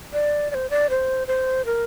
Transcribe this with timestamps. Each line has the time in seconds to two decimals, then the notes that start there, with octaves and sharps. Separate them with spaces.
0.13 D5
0.51 D5
0.54 C5
0.70 D5
0.90 C5
1.27 C5
1.65 A#4